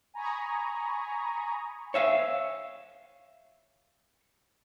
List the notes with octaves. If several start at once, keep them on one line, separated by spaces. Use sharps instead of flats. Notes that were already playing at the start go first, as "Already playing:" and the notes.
G#5 A#5 B5 C#6 D#6
C#5 E5 F5